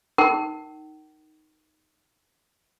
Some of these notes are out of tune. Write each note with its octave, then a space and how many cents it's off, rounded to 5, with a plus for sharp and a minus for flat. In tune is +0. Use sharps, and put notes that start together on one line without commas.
D#4 +0 A#4 +0 G5 -45